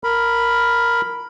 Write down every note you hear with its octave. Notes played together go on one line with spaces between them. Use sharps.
A#4 B5